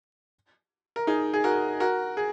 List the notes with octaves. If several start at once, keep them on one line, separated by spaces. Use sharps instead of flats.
A#4
D#4 G#4
G#4
F#4 A#4
F#4 A#4
G#4